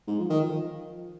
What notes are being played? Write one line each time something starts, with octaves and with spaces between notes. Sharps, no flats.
G#2
F3
D#3
F3